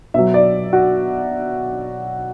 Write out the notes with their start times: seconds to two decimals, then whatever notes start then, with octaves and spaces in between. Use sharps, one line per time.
0.14 B2 F#3 E5
0.34 D5
0.73 F#4